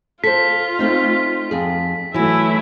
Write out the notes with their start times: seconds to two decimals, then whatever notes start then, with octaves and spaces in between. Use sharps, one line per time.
0.24 F4 A4 C5 B6
0.79 A3 C4 D#4
1.51 F2 G#4
2.14 E3 F#3 A3 E4